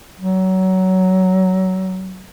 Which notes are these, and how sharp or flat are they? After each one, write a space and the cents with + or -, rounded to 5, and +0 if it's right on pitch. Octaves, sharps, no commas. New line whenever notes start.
F#3 +20